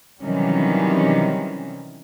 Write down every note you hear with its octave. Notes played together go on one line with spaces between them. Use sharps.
C3 D#3 E3 F#3 G3 C#4